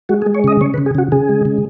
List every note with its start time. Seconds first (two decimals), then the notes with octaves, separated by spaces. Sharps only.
0.09 G#3 F#4
0.22 G#4
0.26 G#3
0.35 C#5
0.44 C#3 D#5
0.61 C#3 C#5
0.74 B4
0.78 C#3
0.86 G#4
0.95 C#3 F#4
1.12 C#3 G#4
1.29 G#3
1.45 C#3